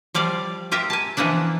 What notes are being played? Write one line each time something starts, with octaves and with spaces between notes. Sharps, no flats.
F3 G3 D5 F5
F4 G4 A#4 E5 G5
G#5 A5
E3 F3 A#3 B3 D4